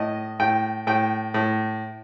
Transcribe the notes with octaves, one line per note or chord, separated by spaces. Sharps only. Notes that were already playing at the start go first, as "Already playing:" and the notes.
Already playing: A2 D#5
A2 G5
A2 G5
A2